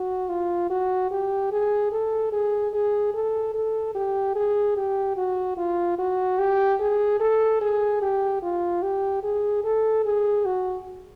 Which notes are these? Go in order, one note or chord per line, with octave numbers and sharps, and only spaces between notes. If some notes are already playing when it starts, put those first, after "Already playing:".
Already playing: F#4
F4
F#4
G4
G#4
A4
G#4
G#4
A4
A4
G4
G#4
G4
F#4
F4
F#4
G4
G#4
A4
G#4
G4
F4
G4
G#4
A4
G#4
F#4